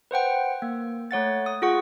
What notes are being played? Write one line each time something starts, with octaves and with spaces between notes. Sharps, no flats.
B4 C5 F#5 G5
A#3
A3 C#5 F#5 A6
D#6
F4 G#4 F#5 C#6